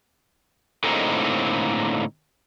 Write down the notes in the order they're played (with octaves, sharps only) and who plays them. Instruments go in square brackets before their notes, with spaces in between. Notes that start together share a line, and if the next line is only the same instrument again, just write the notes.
[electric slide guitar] A2 D3 G#3 A#3 C4 D#4